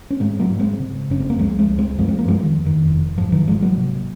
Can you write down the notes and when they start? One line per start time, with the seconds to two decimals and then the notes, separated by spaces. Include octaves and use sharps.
0.11 C#4
0.20 G#2 G#3 C4
0.40 F#3 A#3
0.49 G#2
0.60 G#3 C4
0.80 C#3
1.10 F#1 C#4
1.20 C4
1.30 A#3
1.39 C#2 F3 G#3
1.59 G#3 C4
1.69 C#2
1.78 G#3 C4
1.98 F#2 F3 G#3
2.08 C4
2.19 A#3
2.28 F#2 F3 G#3
2.43 D#3
2.58 F2
2.66 D#3
2.88 F1
3.17 G#2 F3
3.32 D#3 F#3
3.47 G#1 F3 G#3
3.62 F#3 A#3
3.77 C3